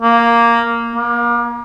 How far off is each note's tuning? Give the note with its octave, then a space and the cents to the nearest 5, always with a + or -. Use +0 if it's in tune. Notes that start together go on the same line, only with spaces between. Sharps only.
A#3 +0
A#3 +35